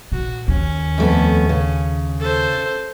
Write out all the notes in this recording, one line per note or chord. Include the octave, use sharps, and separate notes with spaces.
A#2 F#4
D#2 C#4
F2 A3 B3
C#3
A4 C5